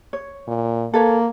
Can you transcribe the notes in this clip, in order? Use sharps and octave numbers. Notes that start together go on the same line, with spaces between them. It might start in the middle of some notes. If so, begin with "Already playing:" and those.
C#5
A#2
A#3 A4 B4 C#5